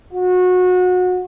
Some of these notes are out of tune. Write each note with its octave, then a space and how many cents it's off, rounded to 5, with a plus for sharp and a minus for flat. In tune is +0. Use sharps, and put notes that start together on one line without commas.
F#4 -25